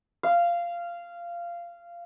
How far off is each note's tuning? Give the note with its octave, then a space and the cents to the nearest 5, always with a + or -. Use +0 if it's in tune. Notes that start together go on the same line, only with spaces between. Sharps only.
F5 -15